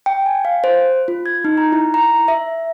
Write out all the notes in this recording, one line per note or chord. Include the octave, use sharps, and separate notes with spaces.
G5
G#5
F5
C5
F4
G#6
D#4
A#5
E4
A#5
E5